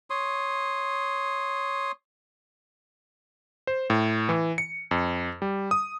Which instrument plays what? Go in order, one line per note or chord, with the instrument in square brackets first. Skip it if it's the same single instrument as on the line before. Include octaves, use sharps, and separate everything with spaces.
[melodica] C#5 C6 D#6
[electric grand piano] C5
A2
E3
C#7
F2
G3
D#6